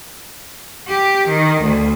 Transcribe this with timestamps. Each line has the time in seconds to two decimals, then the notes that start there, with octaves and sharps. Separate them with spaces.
0.88 G4
1.28 D#3
1.62 D2